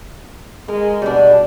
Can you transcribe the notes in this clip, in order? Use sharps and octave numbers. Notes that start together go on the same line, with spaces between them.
G#3 A#4
B2 G3 D4